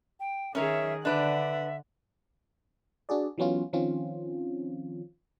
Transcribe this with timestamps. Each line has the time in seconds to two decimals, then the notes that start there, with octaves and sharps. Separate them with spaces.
0.20 G5
0.55 D#3 C#4 G#4 A#4 C#5 E5
1.05 D3 D4 B4 D5 E5 F#5
3.09 D4 F#4 G#4 D5
3.38 E3 F#3 B3 C#4 F4
3.73 D#3 F3 C4 C#4 F4